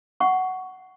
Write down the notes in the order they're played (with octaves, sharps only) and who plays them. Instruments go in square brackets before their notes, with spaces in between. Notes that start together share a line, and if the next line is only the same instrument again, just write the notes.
[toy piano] F#5 C#6